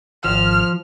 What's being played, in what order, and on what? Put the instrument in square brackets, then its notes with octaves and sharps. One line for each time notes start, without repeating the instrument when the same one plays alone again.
[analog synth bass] G#1 [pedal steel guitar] F3 [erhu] F6